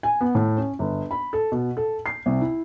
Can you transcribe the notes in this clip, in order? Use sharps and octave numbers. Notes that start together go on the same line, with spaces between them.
G#5
B3
A2
C#4
G1
B5
A4
B2
A4
C7
C2
E4